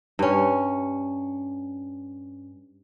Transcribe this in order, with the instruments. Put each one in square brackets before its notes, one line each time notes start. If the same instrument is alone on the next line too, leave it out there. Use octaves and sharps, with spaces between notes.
[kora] G2 C#4